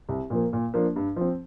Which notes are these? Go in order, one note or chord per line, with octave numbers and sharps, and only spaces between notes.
C2
A#2 F3 A#3
A#2
F3 A#3 D4
G2
F3 C4